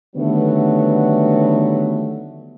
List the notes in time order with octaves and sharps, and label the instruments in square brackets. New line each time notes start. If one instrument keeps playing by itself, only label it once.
[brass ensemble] D3 D#3 F#3 G3 A3 B3